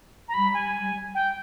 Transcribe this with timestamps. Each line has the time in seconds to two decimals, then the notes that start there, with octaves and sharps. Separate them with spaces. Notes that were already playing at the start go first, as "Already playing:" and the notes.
0.28 A#5
0.34 G3 B5
0.54 G#5
1.15 G5